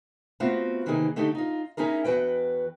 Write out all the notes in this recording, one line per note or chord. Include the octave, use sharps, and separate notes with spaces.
A3 B3 C4 F4 F#4
C3 D#3 E3 A#3 D#4 G#4
D3 A3 D#4 G4
D#4 F4
C#4 D#4 E4 G#4 A#4
E2 G2 F#4 B4 G5